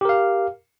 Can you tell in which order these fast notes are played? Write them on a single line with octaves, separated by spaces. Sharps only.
G4 A#4 F5